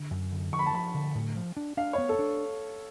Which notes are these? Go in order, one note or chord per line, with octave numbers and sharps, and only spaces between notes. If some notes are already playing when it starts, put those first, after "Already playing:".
Already playing: D3
F#2
D3
F3 C#6
B5
A5
F3 B5
D3
A2
F3
D4
D4 F5
C#5
B3
A4
D4